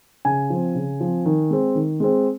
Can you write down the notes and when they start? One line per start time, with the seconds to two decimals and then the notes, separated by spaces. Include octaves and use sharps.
0.25 C#3 G#5
0.50 F3 C4
0.75 C#3
1.00 F3 C4
1.26 D#3
1.51 G#3 C4
1.75 D#3
2.00 G#3 C4